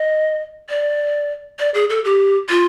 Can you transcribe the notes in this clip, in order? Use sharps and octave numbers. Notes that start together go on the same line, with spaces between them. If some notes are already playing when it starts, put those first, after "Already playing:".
Already playing: D#5
D5
D5
G#4
A4
G4
F4